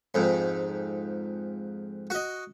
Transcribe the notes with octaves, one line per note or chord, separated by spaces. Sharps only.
F2 G#2
F#4 D#5